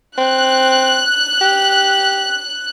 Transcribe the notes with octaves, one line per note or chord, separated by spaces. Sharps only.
C4 F#6
G4